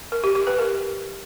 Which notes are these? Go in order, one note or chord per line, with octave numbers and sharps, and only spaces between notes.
A#4
G4
G4
B4
A#4